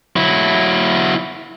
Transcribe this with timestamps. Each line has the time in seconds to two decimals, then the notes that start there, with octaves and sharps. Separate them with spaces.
0.16 F#3 E4